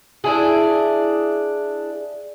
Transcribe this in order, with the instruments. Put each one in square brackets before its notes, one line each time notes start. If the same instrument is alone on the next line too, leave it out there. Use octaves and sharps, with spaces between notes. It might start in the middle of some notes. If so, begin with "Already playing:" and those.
[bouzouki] D4 E4 G#4